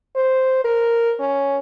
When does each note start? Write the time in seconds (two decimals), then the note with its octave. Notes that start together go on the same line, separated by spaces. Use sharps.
0.16 C5
0.64 A#4
1.20 C#4